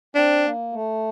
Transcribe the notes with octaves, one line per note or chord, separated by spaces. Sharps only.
C4 D4
A#3
A3